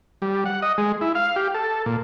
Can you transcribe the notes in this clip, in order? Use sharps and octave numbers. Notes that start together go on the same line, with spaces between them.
G3
F#5
D#5
G#3
E4
F5
G4
A4
A#2